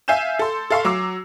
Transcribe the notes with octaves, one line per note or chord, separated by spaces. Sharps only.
E5 F5 G#5 G6 E7
A4 C6
A4 E5 F5 C6 C#6
F#3 D6 E6 C7